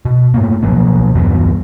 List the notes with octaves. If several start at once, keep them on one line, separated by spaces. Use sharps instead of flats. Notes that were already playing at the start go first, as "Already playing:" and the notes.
B2
G#2 A3 A#3
B2 F3 F#3 A#3
E2 G2 F#3 B3